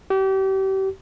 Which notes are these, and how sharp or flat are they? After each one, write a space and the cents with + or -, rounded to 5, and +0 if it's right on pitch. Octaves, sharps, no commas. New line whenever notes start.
G4 -35